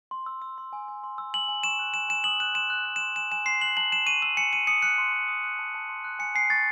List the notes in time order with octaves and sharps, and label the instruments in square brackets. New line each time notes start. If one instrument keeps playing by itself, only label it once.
[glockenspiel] C6
E6
E6
C6
G#5
G#5
C6
E6
G#5 F#7
G#5
C#6 E7
F#6
G#5 E7
G#5 E7
D#6 F#7
F#6 E7
C6 E7
F#6
F#6
E7
C6
G#5 E7
G#5 E7
C6 C7
F#6 F#7
A5 F#7
A5 E7
C#6 D#7
E6 D#7
G#5 C#7
G#5 D#7
D#6 C#7
F#6 C#7
C6
C6
D#6
F#6
A5
A5
C6
F#6
G#5 C#7
G#5 C7
C#6 A6